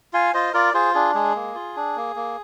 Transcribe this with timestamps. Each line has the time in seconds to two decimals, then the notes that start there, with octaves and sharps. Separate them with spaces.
0.13 F4 F5 G#5
0.34 F4 C5 D#5
0.54 F4 A#4 D5
0.74 F4 G#4 C5
0.94 D4 G#4
1.14 G#3 G#4
1.35 A#3
1.55 F4
1.76 D4
1.96 A#3
2.16 A#3